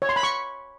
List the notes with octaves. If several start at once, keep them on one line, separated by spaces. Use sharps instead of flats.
C#5
C6
B5
C#6